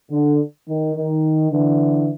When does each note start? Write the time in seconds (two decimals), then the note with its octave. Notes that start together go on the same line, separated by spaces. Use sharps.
0.11 D3
0.67 D#3
0.96 D#3
1.52 D3 E3